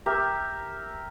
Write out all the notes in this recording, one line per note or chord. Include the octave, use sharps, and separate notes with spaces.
G4 A#4 E5